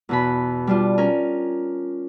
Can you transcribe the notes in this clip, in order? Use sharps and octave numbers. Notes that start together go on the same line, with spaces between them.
E2 B2 B5
G3 D4 F4
C#4 A#4